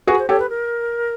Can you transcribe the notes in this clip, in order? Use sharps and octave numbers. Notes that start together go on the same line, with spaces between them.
F#4 G#4 B4
C5
G4 A4 C#5
B4
A#4